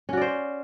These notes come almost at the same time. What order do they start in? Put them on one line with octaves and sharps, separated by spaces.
C#4 F#4 D5 C5